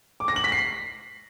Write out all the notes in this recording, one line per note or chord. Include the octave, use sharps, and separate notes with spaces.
D6
A#6
F#7
B6
C7